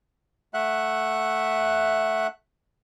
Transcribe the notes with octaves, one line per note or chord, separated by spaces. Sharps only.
A3 E5 F#5 F#6